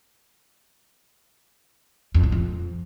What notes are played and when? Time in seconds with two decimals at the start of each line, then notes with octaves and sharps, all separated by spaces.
2.14 F2
2.23 A2
2.32 F2